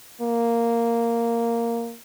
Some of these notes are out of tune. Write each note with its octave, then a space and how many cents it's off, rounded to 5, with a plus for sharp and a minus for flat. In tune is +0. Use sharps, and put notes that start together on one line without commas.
A#3 -5